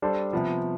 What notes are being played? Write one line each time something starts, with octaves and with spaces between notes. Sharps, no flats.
G3 D4 A4 C5
C3 F3 B3